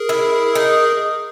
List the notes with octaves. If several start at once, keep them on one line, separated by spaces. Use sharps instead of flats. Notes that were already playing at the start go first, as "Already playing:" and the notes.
Already playing: G#4 A#4
E4
D#4